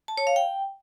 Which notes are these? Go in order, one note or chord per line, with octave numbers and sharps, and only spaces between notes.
A5
C#5
F5
G5